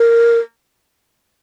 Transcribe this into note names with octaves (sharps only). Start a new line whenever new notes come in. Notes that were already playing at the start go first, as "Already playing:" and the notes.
Already playing: A#4